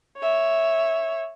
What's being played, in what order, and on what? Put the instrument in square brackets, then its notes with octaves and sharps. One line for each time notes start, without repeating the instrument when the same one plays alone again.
[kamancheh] C#5 E5